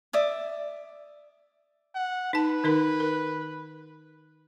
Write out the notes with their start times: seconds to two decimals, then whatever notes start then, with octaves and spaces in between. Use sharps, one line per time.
0.13 D5 E5 D#6
1.95 F#5
2.33 D#4 B4 A5
2.64 D#3 D#4 A#4
3.00 A#4